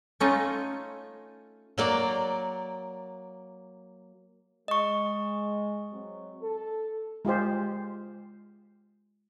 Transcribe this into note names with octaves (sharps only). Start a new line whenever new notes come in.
A3 C#4 D#4 F4
F#3 A#3 D5
G#3 D#5 C#6
F#3 C4
A4
G#3 F4 G4 C5